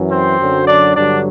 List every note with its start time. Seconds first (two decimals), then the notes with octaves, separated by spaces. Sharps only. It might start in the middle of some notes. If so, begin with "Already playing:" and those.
Already playing: F#2 E3
0.11 C4 C5
0.39 F#2 D3 F#3
0.67 D4 D5
0.96 G2 D3 F#3 D4 D5